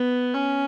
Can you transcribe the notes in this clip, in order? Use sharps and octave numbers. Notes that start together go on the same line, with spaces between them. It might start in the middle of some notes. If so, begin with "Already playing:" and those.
Already playing: B3
C#4